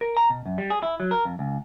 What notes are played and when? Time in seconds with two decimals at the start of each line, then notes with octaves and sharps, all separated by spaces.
0.01 A#4
0.17 A#5
0.30 B2
0.46 F#2
0.58 G3
0.70 G#4
0.83 E4
1.00 F#3
1.11 A#4
1.25 F2
1.39 C#2